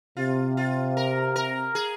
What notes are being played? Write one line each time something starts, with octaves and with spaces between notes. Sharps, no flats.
C3 F4
F4
A#4
A#4
G#4